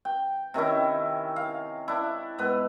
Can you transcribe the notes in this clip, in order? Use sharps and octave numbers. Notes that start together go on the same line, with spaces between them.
G5
C3 D#3 C#4 E4
F5
D4 E4
G#2 B3 B4